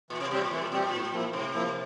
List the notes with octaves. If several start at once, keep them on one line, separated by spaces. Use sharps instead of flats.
A#2 E3
C3
C3 G3 C4 G4
A#2
A2 E3
A#2
A#2 G3 C4 G4
A#2
A2
F3 A#3 E4
A2 C3
F3 A#3 E4